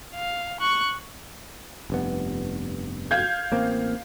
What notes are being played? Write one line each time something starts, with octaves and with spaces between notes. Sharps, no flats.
F5
C#6 F#6
F1 G2 B3
F5 G6 G#6
A1 A#3 C4